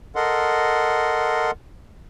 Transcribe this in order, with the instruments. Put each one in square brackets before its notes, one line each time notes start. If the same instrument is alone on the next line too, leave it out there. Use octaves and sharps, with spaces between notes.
[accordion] A4 A#4 D#5 F#5 C6